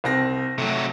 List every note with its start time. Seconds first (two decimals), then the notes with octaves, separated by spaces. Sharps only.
0.04 C2 C4 A#6
0.58 C3 F#3 A3